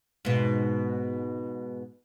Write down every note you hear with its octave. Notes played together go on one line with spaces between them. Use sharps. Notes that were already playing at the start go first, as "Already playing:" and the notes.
G#2 B2